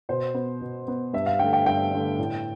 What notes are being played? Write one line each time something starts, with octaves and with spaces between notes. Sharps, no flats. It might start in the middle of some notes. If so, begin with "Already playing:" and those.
B2 C5
B3
B2
B3
G2 E5
F5
D3 A3 G5
G5
G2 G5
D3 A3
A2